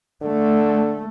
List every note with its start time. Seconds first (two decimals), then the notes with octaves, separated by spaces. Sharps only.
0.22 D3 A3